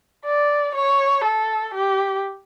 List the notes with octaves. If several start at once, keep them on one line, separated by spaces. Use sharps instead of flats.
D5
C#5
A4
G4